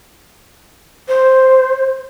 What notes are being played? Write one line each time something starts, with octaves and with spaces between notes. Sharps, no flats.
C5